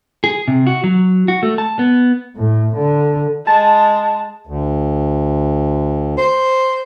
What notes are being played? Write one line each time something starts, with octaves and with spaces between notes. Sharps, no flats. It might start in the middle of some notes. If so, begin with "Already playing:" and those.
G#4
C3
F#4
F#3
F#4
A3
A5
B3
A2
D3
G#3 A5
D2
C5